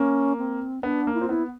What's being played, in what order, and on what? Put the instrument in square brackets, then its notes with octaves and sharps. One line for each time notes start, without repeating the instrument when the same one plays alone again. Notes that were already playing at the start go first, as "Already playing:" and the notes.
Already playing: [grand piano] A#3 [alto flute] C#4
[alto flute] C4
[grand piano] B3 [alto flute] D4
[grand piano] A#3
[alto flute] E4
[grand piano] C4 [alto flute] F4
[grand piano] B3 [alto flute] E4